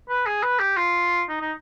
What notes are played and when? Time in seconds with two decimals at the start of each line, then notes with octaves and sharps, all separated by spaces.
0.09 B4
0.26 G#4
0.43 B4
0.60 G4
0.77 F4
1.29 D#4
1.41 D#4